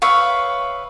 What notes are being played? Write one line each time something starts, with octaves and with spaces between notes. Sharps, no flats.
B4 C#5 E5 F5